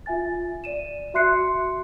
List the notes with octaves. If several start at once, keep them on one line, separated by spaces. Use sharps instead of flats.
F4 E5 G#5 A6
D5 D#7 E7
F#4 E5 C6 F#6 C7 C#7